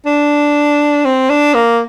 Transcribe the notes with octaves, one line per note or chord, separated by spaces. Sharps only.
D4
C4
D4
A#3